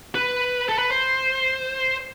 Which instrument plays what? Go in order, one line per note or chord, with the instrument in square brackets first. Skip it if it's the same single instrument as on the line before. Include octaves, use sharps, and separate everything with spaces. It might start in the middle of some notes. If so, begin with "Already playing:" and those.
[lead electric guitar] B4
A4
B4
C5